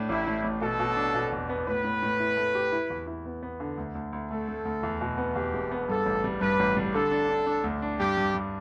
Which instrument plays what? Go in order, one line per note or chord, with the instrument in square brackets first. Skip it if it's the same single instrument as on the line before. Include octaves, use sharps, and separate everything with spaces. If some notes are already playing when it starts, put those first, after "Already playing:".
Already playing: [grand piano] A2 A3 D4
[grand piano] A1 [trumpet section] E4
[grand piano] A2
A1
[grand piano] B2 [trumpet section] A4
[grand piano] B2
D4
B2
E2
B3
[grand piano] A2 [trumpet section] B4
[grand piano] A2
A2
E4
A3
G4
E4
E2
E4
B3
B3
D3
D2
D2
D2
[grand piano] A3 [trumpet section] A4
[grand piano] A3
D2
E2
B2
B3
[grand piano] E2 [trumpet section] G4
[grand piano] E1
B3
[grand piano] G2 [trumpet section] A4
[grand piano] A1
G3
[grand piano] G2 [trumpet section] B4
[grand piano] A1
G3
[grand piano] D3 [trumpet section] A4
[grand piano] D4
D4
D4
D2
D4
[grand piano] G2 [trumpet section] G4
[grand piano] G2
G2